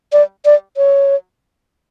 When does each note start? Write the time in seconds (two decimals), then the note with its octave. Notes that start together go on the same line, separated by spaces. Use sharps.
0.13 D5
0.45 D5
0.77 C#5